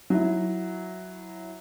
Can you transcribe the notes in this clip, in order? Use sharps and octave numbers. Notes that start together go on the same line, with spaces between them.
F#3 E4